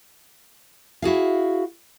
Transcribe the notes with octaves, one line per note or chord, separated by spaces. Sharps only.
E4 F#4 G#4 F5